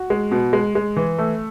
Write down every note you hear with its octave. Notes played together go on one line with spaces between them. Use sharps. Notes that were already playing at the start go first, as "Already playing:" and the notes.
Already playing: F#4
G#3
B2
G#3
G#3
E3
A3